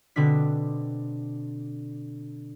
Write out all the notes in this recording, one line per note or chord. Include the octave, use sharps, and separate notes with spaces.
B2 D3 C4 D4 B6